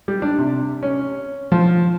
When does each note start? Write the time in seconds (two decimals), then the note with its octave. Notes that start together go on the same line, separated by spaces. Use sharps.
0.08 G3
0.22 D4
0.38 C3
0.83 C#4
1.52 F3